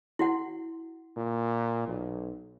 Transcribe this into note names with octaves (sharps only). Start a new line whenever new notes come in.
E4 F#4 F#5
A#2
B1